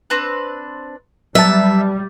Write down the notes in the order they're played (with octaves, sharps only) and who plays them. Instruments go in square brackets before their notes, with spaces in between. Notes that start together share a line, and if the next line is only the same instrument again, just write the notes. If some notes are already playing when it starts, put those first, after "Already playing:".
[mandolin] C4 D4 B4
[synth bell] F#3 [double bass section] G3 [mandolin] B3 A5 [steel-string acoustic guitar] E5